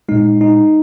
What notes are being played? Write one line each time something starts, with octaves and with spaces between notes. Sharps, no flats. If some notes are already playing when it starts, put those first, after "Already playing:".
A#2 G#3 D#4
D#4